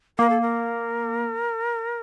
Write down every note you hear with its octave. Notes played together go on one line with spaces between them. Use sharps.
A#3 A#4
A4
A#4